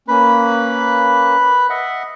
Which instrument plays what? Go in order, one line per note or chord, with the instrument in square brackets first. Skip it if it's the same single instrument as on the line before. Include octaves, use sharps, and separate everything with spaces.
[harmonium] A#3 C#4 [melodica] B4 B5
[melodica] D#5 E5 F#5